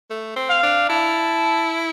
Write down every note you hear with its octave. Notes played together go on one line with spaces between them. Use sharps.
A3
C4
F5
D4
E4 A5